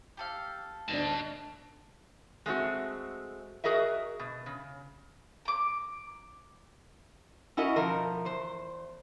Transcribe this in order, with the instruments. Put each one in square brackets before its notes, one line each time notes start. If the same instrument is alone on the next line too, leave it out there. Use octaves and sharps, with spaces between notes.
[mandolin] G4 A4 F5
[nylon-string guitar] D2 D4 [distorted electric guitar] D#5 A5
[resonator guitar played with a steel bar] G#3 A3 C4 F#4
F#4 G#4 A#4 D#5 E5
B2
C#3
[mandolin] A#4 D6
[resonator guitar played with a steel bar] C#4 E4 F#4 A#4 D#5
B2 F3 A3 A#4
E2 C5